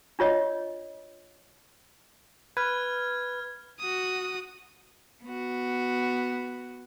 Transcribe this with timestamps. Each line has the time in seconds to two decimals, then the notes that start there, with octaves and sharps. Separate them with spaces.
0.19 D4 F4 C#5 D#5
2.57 B4 F6 G#6
3.80 F#4 D#6
5.24 B3 F#4